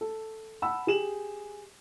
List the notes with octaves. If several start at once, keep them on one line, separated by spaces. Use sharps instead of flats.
A4
F#5 A5 B5 E6
G4 G#4 E7 F#7